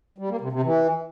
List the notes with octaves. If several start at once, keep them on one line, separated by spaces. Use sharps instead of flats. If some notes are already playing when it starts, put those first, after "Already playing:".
G3
A#3
C3
C3
E3